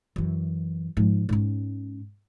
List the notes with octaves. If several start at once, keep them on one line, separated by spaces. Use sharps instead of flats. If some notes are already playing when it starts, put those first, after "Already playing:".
F#2 E3
G#2 F3
G#2 C#4